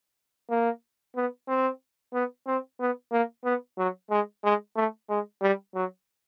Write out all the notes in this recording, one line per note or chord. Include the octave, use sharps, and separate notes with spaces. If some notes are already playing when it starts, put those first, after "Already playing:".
A#3
B3
C4
B3
C4
B3
A#3
B3
F#3
G#3
G#3
A3
G#3
G3
F#3